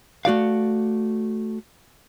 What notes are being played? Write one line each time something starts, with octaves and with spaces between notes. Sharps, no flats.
A3 F#4 D5 F5